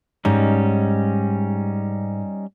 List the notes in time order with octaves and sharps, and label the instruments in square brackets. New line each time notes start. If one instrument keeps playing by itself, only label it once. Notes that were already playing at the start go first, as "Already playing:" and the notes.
[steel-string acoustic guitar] G#2 [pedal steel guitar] G3 C#4 D#4